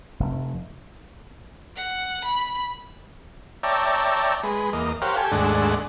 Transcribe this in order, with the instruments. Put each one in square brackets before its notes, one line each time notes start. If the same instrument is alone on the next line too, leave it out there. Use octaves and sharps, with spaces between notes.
[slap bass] F1
[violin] F#5
B5
[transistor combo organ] C#5 D5 E5 G5 A5 A#5
G#3 B4
E2 A#3 D#5
G4 A#4 C5 C#5 F5 F#5
G4 A4 G#5
D#2 G#2 G#3 A3 D4 F#5